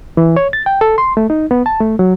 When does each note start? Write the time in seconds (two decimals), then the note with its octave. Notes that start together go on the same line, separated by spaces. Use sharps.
0.17 E3
0.36 C#5
0.53 A6
0.66 G5
0.81 A4
0.98 C6
1.17 A3
1.30 D#4
1.51 B3
1.66 A5
1.80 A3
1.99 F#3